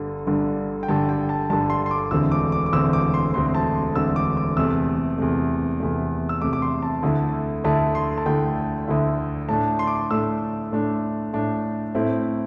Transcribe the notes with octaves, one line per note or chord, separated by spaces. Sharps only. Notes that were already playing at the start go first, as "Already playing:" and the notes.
Already playing: G1 G2 D3
G1 G2 D3
G5
G1 G2 D3 A5
G5
A5
G1 G2 D3 A5
C6
C6
D6
E1 D2 D3 C4 E6
D6
D6
D6
E1 D2 D3 C4 E6
D6
C6
E1 D2 D3 C4 C6
A5
C6
E1 D2 D3 C4 E6
D6
D6
E2 C3 A3 E6
E2 C3 A3
E2 C3 A3
E6
E2 C3 A3 D6
D6
C6
A5
D2 D3 A3 E4
D2 D3 A3 E4 A5
C6
A5
D2 D3 A3 E4 G5
D2 D3 A3 E4
A2 A3 D4 A5
C6
D6
C6
A2 A3 D4 E6
A2 A3 D4
A2 A3 D4
A2 A3 C4 E4